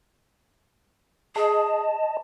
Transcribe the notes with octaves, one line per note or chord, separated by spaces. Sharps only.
G#4 D#5 A5